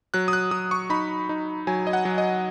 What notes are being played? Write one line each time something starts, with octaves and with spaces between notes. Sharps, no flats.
F#3 F#6
D#6
F#6
F#3 D#6
C#6
D#4 B5
D#4
F#3 G#5
D#5
F#5
F#3
D#5